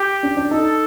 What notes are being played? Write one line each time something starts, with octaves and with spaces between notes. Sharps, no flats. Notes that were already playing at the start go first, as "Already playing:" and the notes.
Already playing: G4
D4
D4
D#4 A4